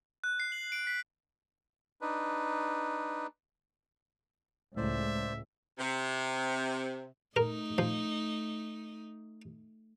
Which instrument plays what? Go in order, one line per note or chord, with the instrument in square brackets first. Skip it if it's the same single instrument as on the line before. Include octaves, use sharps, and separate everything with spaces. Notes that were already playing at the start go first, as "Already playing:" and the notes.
[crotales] F#6
C7
F#7
D7
B6
[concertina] D4 D#4 B4
[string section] C#2 [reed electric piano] A2 [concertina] C5 D5 [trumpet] E5
[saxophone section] C3
[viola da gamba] A3 D#4 [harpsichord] A#4
[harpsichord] F3